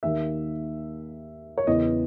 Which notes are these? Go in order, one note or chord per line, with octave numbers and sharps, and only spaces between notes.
D#2 D#3 A#3 E5
C#5
E2 C#3 E3 B3 D#5